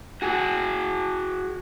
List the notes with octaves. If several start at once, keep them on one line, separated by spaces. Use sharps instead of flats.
F#4 G#4